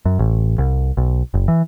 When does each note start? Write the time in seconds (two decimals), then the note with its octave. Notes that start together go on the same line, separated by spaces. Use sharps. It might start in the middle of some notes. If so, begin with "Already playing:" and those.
0.06 F#2
0.19 A1
0.58 C2
0.97 B1
1.34 F#1
1.48 E3